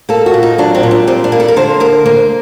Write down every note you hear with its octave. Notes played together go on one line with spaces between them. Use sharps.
A#3 A4
F#4
A#2
D#4
F#3 D4
C4
A#2
D4
G3 C4
D4
A#3
A4
A#4
D3 C5
D2 A#4
A#3 C5